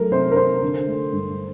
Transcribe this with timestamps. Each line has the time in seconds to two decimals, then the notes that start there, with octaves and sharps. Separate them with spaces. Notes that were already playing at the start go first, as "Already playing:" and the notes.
Already playing: F#3 A3 A#4
0.11 C3 C5
0.31 A#4
0.36 C3 C5
0.62 D3
0.87 A3
1.13 G2